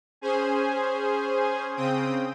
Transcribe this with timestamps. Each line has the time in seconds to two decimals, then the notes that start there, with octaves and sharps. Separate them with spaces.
0.21 C#4 G#4 C5 G#5
1.76 C#3 C4 G5 D#6